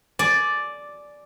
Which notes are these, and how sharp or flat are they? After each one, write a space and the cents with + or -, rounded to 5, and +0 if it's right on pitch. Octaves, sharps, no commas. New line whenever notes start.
D5 +0 G#5 +25